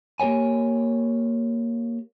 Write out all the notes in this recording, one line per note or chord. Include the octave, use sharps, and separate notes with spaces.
A#3 G4 A#4 C#5 G#5